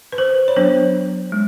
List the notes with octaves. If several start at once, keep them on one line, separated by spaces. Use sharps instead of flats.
B4
C5
C#5
F#3 B3 D4 C5
G#3